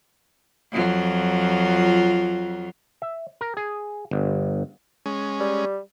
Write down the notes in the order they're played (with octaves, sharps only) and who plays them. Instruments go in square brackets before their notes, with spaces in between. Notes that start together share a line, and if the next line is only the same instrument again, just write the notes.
[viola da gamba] F2 F#3 F4
[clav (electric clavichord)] E5
A#4
G#4
G1
[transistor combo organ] G#3 C#4
[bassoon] G3